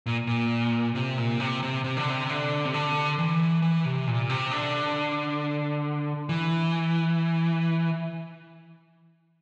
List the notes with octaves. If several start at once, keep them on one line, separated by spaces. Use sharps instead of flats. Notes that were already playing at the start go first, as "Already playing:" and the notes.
A#2
A#2
C3
A#2
C3
C3
C3
D3
C3
D3
C3
D3
E3
E3
C3
A#2
C3
D3
E3